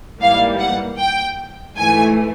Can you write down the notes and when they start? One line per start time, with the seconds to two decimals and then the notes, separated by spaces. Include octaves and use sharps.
0.21 G#2 E3 G3 A#3 F5
0.60 F#5
0.98 G5
1.76 G#2 E3 A3 G#5